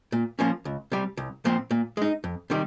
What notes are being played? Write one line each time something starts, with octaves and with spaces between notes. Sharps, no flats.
A#2
F3 A#3 C#4
C#2
C3 G3
C2
A#2 F3 C4
A#2
G#3 D#4
F2
C3 D#3 G3